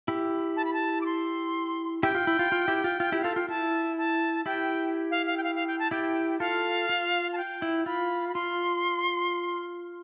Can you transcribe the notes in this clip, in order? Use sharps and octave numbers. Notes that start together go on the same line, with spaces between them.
E4 G4
A5
B5
A5
D6
C6
E4 G4 G5
F4
E4
F4
F4
E4 G4
F4
F4
E4 G4
F4 A4 F5
F4 G5
E4 A5
A5
E4 G4 G5
F5
F5
G5
F5
F5
G5
A5
E4 G4 G5
F4 A4 F5
F4
A5
G5
E4
F4 B5
B5
F4 C6